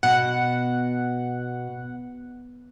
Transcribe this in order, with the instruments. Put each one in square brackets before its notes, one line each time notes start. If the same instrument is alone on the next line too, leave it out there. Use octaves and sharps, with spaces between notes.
[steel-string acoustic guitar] B2 [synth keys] F#5